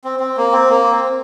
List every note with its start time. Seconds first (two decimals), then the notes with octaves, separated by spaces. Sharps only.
0.04 C4
0.20 C4
0.37 A#3
0.52 C4
0.70 A#3
0.91 C4